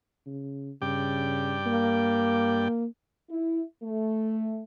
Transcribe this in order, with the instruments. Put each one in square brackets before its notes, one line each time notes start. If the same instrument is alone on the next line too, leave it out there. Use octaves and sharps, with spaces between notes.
[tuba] C#3
[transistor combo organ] G2 D5 G5 [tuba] C#3
[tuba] A#3
[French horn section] E4
A3